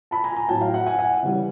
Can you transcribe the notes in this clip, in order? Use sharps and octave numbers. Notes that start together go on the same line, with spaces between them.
A5 B5
G#5 A#5
G#5 A#5
A2 F#3 G5 A5
F5 G5
E5 F#5
F#5 G#5
F#5 G#5
C#3 E3 G3